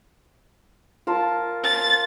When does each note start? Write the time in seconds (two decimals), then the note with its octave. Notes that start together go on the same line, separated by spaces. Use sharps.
1.07 F4 A#4 A5
1.64 A6